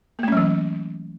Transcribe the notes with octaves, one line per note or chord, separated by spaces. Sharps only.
E3 F#3 A3 A#3 C#4